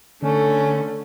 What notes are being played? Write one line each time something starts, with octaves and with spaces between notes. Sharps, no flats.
D3 A3 C#4